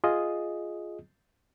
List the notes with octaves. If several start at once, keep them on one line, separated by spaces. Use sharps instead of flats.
F4 G#4 D#5 D#6